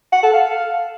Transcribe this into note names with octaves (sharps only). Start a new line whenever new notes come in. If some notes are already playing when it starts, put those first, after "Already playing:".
F#5
A4
F5